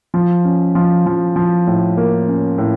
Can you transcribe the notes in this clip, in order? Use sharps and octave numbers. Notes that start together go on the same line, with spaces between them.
F3
C#4
F3
F3
F3
A2
A#3
C#4
A2